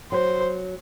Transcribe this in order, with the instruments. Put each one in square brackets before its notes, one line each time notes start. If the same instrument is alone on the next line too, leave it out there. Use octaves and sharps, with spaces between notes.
[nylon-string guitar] F#3 [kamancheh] C5